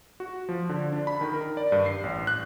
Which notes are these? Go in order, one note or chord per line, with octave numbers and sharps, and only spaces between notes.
F#4
F3
D3
D4
B5
D#3
A#4
D5
G2
C7
A1
F#6